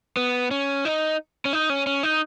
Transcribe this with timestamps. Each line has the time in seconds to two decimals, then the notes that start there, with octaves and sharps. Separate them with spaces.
0.17 B3
0.51 C#4
0.85 D#4
1.45 C#4
1.53 D#4
1.70 C#4
1.87 C#4
2.03 D#4